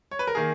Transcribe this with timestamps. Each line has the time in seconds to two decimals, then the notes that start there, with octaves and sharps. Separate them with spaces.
0.11 C#5
0.19 B4
0.27 A#4
0.35 D#3 A#3 G#4